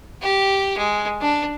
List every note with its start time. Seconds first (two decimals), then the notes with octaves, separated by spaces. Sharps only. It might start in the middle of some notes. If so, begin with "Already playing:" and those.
0.22 G4
0.78 G#3
1.21 D4